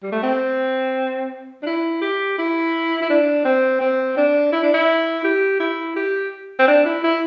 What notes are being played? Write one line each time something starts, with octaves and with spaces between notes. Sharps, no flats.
G3
A3
C4
D4
E4
G4
E4
E4
D4
C4
C4
D4
E4
D4
E4
G4
E4
G4
C4
D4
E4
E4